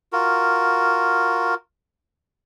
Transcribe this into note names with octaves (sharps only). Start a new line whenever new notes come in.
F4 F#4 A#4